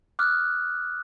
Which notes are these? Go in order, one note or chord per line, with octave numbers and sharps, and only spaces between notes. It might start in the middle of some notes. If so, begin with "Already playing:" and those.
D6 D#6 F6 F#6